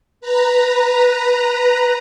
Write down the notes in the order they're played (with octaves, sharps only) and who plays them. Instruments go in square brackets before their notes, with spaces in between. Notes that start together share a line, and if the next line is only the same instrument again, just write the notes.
[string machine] B4 A#5